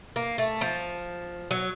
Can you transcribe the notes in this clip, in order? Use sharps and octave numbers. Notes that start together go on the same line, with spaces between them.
A#3
A3
F3
F#3